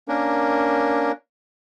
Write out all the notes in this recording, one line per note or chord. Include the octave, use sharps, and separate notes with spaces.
A#3 C#4 D4 A#4